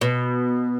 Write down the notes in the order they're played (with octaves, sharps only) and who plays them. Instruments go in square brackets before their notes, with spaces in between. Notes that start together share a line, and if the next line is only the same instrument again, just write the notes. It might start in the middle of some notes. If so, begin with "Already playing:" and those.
[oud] B2